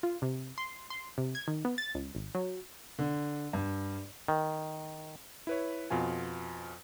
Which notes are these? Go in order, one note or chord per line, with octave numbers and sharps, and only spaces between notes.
F4
C3
C6
C6
C3
G#6
D#3
B3
A6
C#2
G#1
F#3
D3
G2
D#3
E4 B4 C#5
F2 B2 F4 G#5